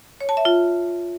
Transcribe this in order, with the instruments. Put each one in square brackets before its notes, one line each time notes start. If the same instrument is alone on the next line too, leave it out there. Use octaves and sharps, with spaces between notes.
[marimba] C#5
A5
E5
F4